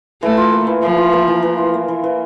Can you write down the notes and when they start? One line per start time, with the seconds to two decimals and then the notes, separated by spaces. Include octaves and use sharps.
0.22 E3 A3
0.37 F4
0.53 A#3
0.67 E3
0.82 E3 F3
0.98 F4
1.13 A#3
1.28 E3
1.43 E3
1.58 F4
1.74 A#3
1.88 E3
2.04 E3